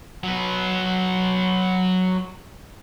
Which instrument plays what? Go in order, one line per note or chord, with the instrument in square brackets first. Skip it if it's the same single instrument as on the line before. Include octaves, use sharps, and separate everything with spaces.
[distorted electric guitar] F#3 B4